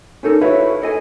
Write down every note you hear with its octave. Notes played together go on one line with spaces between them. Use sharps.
C#4 D#4 A4 A#4
E4 F#4 B4 C#5 E5 F5
A4 D#5 G#5